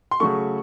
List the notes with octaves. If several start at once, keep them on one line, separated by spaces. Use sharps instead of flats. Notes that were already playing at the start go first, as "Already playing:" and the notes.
C6
C#3 F#3 A3 C#6